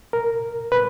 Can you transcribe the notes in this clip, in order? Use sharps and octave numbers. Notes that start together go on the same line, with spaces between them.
A#4
B4